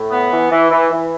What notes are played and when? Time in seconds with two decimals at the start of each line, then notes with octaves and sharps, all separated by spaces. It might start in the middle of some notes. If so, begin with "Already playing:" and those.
Already playing: A2
0.11 B3
0.31 E3
0.51 E3
0.71 E3
0.91 E3